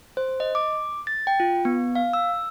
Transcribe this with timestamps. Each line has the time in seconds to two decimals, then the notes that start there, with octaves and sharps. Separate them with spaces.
0.17 C5
0.40 D#5
0.55 D6
1.07 A6
1.27 G5
1.40 F4
1.65 B3
1.95 F5
2.13 E6